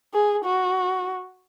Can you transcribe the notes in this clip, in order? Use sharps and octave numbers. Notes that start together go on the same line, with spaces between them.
G#4
F#4